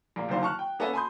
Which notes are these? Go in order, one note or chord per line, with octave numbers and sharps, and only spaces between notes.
A#1 A#3
F#1 F#2 D3 D#3 C5 F5
A5 C#6 F6 F#6
G5
A#3 B3 C#4 A4 E5 G#5
G#5 A5 B5 C6 D#6 G6